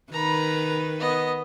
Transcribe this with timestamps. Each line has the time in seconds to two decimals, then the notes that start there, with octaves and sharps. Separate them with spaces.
0.13 D#3 B4 A#5 B5
1.00 B3 D#5